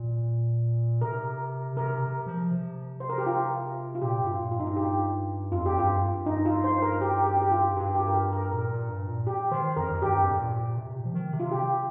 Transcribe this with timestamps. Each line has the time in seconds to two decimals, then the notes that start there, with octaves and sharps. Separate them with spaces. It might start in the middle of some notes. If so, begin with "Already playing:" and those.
Already playing: A#2
1.01 C3 A#4
1.77 C3 A#4
2.02 C3
2.26 F3
2.51 C3
3.00 C5
3.10 A#4
3.18 G4
3.27 F4
3.95 F4
4.01 A#2 G4
4.21 G2
4.27 F4
4.39 A#2
4.52 F4
4.58 G2 D#4
4.67 F4
4.76 G4
5.52 F2 F4
5.66 G4
5.77 G2 F4
5.96 F2
6.01 G2
6.26 D#4
6.45 F4
6.64 C5
6.82 A#4
7.02 G4
7.26 G4
7.42 G4
7.52 F4
7.77 G2 G4
7.95 G4
8.07 A#4
8.14 G4
8.33 A#4
8.52 A#2 A#4
8.71 A#2
8.89 G2
9.08 A#2
9.27 G4
9.51 D#3 C5
9.76 F2 A#4
9.92 F2
10.02 G2 G4
10.23 F2
10.31 G2
10.39 A#2
10.77 C3
10.95 A#2
11.05 F3
11.14 D#3
11.33 C3
11.40 F4
11.52 G4